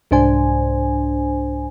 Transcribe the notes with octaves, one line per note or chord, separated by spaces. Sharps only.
C2 G#2 D4 C5 G#5